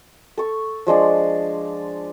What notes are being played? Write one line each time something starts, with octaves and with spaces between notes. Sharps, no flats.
A4 C#6
F3 G#3 D4 D5